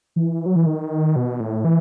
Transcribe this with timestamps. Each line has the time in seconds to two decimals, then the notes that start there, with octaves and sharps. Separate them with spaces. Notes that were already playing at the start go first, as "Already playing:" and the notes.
0.16 E3
0.46 F#3
0.56 E3
0.66 D#3
1.16 B2
1.40 A2
1.65 E3